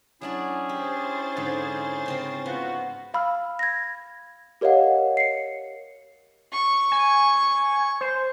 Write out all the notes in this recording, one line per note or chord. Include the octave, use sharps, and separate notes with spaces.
F#3 C#4 D4 E4 G#4 D5
G4 C5 A6
G#2 D3
C#3 C4 A#4
B3 F4 F#4
F5 B5 E6 F6
G#6 A#6
G4 A#4 C#5 D#5 F5 F#5
C7 C#7
C#6
G#5
C5